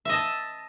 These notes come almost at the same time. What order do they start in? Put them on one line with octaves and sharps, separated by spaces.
E5 D#5 A5